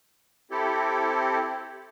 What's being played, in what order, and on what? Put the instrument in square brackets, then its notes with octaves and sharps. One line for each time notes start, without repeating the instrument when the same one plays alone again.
[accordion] C4 E4 G4 A4